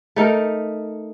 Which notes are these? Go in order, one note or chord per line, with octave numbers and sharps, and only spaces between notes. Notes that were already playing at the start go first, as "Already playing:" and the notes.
A3 D#4 A4 A#4